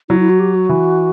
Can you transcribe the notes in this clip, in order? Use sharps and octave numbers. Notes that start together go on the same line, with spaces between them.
F#3 E4
E4
F#4
G4
F#4
E3